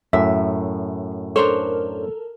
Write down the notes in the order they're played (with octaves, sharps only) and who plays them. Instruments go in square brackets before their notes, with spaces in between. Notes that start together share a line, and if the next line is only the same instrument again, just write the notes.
[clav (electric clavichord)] F#2 A2 [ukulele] E5
[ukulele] D4 C5 C#5 [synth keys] A4 A#4